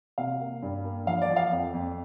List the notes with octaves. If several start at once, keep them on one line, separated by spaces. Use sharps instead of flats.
C3 F5
A#3
G2
A#3
F3 F5
D5
F3
F5
F2
F2